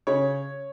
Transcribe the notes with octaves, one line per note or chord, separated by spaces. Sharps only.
C#3 C#5